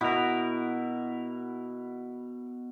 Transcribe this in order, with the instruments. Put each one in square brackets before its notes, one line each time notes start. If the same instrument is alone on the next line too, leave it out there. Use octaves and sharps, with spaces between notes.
[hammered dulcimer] B2 [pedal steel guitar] E4 A#4